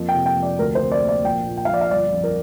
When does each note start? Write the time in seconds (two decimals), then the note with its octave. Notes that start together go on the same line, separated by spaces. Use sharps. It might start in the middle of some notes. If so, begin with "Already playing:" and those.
Already playing: F2 A#3
0.09 G5
0.14 C3
0.26 G5
0.36 F2
0.43 D5
0.59 D2 A#4
0.75 C5
0.80 C3
0.92 D5
1.02 A#3
1.08 D5
1.24 A#1 G5
1.46 A#2
1.57 G5
1.65 F5
1.68 A#1
1.74 D5
1.81 F5
1.91 G1 D5
2.12 F2
2.24 A#4